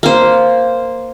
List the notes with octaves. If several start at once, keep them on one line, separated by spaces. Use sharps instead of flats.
A#3 C5